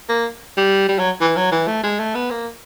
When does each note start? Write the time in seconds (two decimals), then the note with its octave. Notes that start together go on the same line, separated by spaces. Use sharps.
0.09 A#3
0.57 G3
0.88 G3
0.99 F#3
1.20 E3
1.36 F#3
1.52 E3
1.67 A3
1.83 G#3
1.99 A3
2.15 B3
2.31 A#3